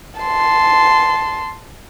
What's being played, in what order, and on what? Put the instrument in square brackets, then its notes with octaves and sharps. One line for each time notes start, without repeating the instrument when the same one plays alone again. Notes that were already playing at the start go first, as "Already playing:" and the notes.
[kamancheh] A5 C6